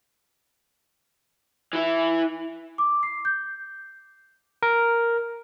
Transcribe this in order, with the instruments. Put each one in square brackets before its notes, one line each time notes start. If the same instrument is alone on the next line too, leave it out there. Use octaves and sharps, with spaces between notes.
[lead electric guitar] E3 E4
[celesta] D6
C7
G6
[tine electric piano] A#4